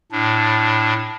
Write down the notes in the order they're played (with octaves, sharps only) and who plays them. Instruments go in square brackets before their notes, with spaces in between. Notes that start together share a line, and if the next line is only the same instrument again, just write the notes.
[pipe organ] A2 D4